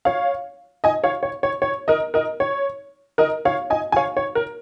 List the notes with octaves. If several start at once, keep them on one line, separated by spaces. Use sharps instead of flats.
C#5 F5
D#5 G#5
C#5 F5
C#5
C#5
C#5
A#4 D#5
A#4 D#5
C#5
A#4 D#5
C#5 F5
D#5 G#5
G#5
C#5 F5
C#5
A#4